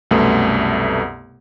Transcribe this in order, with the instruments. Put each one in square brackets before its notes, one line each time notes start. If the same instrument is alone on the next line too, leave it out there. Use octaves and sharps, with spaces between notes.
[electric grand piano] C2 F#2 B2 A3 B3